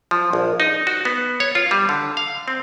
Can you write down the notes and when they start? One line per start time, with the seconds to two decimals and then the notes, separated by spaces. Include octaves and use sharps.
0.11 F3
0.33 A#1
0.60 D#4
0.87 F#4
1.05 B3
1.40 C#5
1.55 F4
1.71 G3
1.89 D3
2.17 F5
2.48 C4